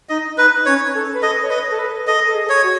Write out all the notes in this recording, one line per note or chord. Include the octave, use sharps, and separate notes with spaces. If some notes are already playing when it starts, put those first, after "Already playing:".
D#4 D#5
D#4 B4
C#4 C#5
A4
B4
A4 D#5
C#5
B4 D#5
A4
B4
A4 D#5
A4
G#4
C#5
F#4